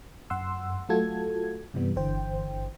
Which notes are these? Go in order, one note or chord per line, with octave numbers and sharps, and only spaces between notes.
F#2 F#5 C6 E6
F#3 A3 F4 F#4 A4 G#6
G2 C3 E3 G3 B3
G1 D3 E3 C5 G5